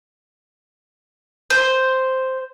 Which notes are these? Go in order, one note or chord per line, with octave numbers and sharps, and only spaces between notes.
C5